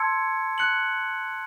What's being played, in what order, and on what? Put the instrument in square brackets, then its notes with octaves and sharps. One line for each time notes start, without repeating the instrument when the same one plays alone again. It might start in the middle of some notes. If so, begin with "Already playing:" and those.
Already playing: [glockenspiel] A5 C6 E6 G#6 C#7
F#6 C#7 F#7